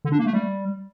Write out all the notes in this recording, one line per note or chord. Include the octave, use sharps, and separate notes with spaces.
D3
D4
A#3
A3
G3